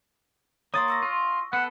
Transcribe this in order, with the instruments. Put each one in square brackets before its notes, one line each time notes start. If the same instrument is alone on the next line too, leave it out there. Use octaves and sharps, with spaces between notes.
[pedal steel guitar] A#3 [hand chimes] C#5 C6 [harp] D#6 A6 D#7
[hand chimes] C#6 E6 A#6
[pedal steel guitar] F4
[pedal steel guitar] B3 A4 [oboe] F#5